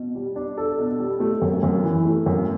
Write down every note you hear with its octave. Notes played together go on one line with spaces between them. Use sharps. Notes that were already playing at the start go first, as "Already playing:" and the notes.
Already playing: B2
G3
D4
A4
B2
G3
A3
F#2
F#2
E3
A3
F#2